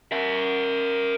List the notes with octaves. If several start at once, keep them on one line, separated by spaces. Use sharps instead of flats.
A#4 E5